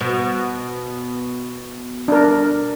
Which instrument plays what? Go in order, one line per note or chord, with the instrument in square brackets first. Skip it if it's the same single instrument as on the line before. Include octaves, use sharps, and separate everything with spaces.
[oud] B2
[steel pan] D4 A#4